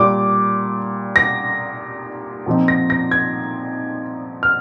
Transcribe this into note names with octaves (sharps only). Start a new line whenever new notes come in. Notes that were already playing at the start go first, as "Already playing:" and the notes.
Already playing: A#2 G3 D4 D6
A#6
A#2 F3 C4 D#4
A#6
A#6
G#6
F6